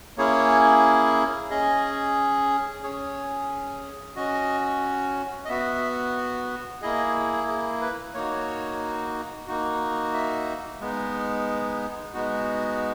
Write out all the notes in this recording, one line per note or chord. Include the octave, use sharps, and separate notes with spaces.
A#3 C#4 E4 G#4 C#5
C#4 G#4 D#5
C#4 G#4 C#5
C#4 F#4 D#5
D#5
B3 F#4 E5
A#3 E4 G#4 D#5
G#4
B4
A#3 D#4 F#4 C#5
A#3 D#4 F#4
E5
G#3 B3 D#4
G#3 B3 D#4 F#4